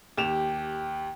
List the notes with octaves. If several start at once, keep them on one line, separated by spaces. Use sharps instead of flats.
D#2 G4 E7 F7